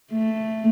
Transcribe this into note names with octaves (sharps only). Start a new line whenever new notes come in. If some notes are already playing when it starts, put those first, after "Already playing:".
A3